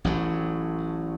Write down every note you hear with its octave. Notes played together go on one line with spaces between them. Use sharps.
A1 A2 F#3